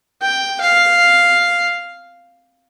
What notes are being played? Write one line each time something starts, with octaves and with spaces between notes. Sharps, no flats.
G5
F5